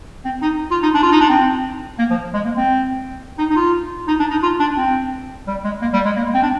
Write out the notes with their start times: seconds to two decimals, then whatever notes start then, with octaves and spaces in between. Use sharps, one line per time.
0.25 C4
0.42 D#4
0.71 F4
0.83 D#4
0.94 D4
1.03 F4
1.12 D#4
1.21 D4
1.29 C4
1.99 A#3
2.10 F3
2.34 G#3
2.45 A#3
2.57 C4
3.38 D#4
3.50 D#4
3.56 F4
4.08 D#4
4.20 D4
4.31 D#4
4.42 F4
4.60 D4
4.77 C4
5.47 G3
5.64 G#3
5.82 A#3
5.93 G3
6.05 G#3
6.16 A#3
6.34 C4
6.43 D4